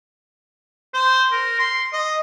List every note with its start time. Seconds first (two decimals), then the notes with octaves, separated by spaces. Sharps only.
0.94 C5
1.32 A#4
1.59 C6
1.93 D#5